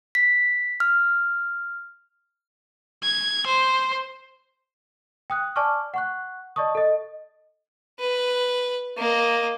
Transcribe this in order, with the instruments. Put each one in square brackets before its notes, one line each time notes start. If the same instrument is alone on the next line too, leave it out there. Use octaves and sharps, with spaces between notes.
[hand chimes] B6
F6
[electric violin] G#6
C5
[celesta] G5 D#6 F#6
D5 G#5 A5 C#6 D6 F6
F#5 C#6 F#6
D5 D#5 A5 C#6 D#6
A4 D#5
[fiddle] B4
A#3 D#5